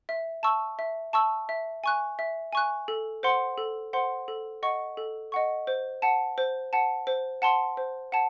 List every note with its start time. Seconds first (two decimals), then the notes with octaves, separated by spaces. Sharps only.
0.09 E5
0.43 A5 C#6 E6
0.79 E5
1.13 A5 C#6 E6
1.49 E5
1.84 G#5 C#6 F#6
2.19 E5
2.53 G#5 C#6 F#6
2.88 A4
3.23 C5 F#5 C6
3.58 A4
3.93 C5 F#5 C6
4.28 A4
4.63 D#5 F#5 C#6
4.97 A4
5.32 D#5 F#5 C#6
5.67 C5
6.02 F#5 A5
6.38 C5
6.73 F#5 A5
7.07 C5
7.42 F#5 A5 C6
7.77 C5
8.12 F#5 A5